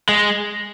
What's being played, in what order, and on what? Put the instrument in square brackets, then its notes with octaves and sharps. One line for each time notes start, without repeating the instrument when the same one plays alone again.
[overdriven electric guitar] G#3